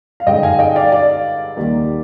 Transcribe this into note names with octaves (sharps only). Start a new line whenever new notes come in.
F5
G2 D3 G#3 D#4 D#5 G5
F5 G#5
D#5 G5
D5 F5
D5 F5
D#2 D#3 G3 A#3